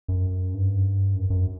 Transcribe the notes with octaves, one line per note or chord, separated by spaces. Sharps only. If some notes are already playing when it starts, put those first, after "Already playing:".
F#2
G2
F#2
F#2